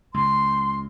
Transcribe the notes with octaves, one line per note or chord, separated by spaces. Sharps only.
C#2 C6